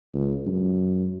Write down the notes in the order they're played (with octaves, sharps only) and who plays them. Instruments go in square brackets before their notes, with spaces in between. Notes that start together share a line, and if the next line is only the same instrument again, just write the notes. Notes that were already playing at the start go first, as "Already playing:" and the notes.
[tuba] C#2
F#2